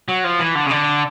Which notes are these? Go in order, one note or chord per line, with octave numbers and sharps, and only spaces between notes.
F#3
F3
E3
D3
C#3
D3